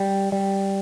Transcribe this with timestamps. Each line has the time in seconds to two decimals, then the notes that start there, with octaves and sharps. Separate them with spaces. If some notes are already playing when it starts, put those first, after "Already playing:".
Already playing: G3
0.32 G3